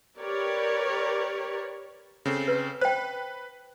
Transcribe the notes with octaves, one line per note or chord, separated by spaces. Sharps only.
G4 A#4 B4 C#5 D5
C#3 C4 A4
B4
B4 C5 G5